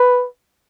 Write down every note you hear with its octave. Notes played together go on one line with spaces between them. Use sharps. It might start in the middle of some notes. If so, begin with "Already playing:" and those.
Already playing: B4